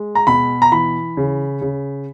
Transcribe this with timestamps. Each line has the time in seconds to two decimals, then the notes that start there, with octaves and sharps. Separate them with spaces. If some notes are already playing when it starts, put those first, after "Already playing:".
Already playing: G#3
0.15 A#5
0.27 B2 B5
0.62 A#5
0.72 E3 B5
1.17 C#3
1.61 C#3